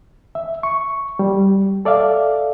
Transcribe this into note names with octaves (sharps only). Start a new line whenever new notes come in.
E5
C#6
G3
A4 D5 E5 F5